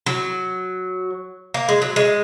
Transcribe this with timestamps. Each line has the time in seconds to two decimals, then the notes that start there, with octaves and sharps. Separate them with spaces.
0.06 F#3
1.54 A#3
1.69 G#3
1.82 F#3
1.96 G#3